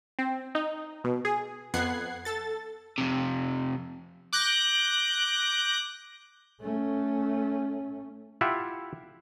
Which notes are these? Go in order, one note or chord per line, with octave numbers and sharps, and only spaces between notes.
C4
D#4
B2
G#4
F2 B3 F#5 F#6 G#6 C7
A4 A6
F2 C3
D6 F#6 G6 A#6
A3 C#4
E4 F4 G4 E5 F#5